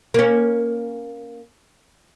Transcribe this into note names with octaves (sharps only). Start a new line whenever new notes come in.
A#3 C#4